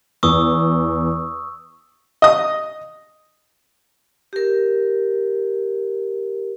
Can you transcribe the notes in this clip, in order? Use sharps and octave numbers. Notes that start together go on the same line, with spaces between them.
E2 C#6 D#6 E6
D#5 D#6
G4 A#4